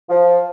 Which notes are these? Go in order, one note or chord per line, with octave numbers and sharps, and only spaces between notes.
F3